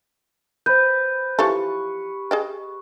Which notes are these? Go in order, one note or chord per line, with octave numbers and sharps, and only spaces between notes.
B4 C5 G6
E3 F3 G4 A4 C#6
G#4 D#5 G5